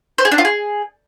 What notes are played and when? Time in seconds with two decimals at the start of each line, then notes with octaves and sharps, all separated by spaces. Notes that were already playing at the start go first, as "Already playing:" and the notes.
0.18 C5
0.25 G#4
0.32 D4
0.38 F4
0.45 G#4